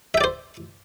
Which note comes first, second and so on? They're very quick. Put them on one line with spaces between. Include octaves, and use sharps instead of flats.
E5 G5 D5 C5